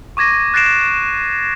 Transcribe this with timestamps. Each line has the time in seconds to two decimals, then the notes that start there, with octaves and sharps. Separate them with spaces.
0.17 C#6 D6 G#6 A#6 D#7
0.54 F#6 A6 A#6 C7 D7 E7